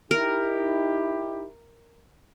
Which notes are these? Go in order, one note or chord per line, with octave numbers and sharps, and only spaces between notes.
D#4 E4 G4 A#4